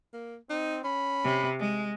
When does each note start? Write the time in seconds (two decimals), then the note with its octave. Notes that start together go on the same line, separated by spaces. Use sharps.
0.13 A#3
0.50 C4 D#4
0.84 C#4 B5
1.24 C3
1.60 G#3